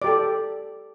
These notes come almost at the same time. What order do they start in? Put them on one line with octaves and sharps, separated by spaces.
D5 G4 A4